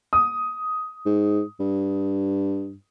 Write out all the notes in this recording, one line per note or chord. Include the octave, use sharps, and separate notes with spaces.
D#6
G#2
G2